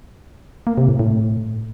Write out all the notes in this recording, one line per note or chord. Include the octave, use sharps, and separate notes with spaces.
A#3
C3
A2
A2